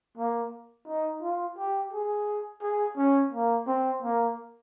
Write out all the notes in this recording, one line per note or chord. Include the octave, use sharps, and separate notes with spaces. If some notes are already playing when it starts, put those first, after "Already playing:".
A#3
D#4
F4
G4
G#4
G#4
C#4
A#3
C4
A#3